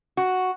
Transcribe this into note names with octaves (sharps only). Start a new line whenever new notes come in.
F#4